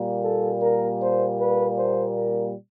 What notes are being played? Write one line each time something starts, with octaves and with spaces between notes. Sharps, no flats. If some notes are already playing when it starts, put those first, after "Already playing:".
Already playing: A#2 G3 A#3
A4
A#4
C5
B4
C5
A#4